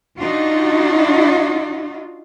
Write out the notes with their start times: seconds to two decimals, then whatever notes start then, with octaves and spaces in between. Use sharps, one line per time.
0.18 D4 D#4 F4 F#4